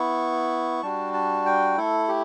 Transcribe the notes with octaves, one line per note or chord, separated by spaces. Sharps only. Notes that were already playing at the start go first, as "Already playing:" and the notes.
Already playing: B3 E4 C#6
G3 D4 F#4 A5
A5
G5
A3 E4 A4
G4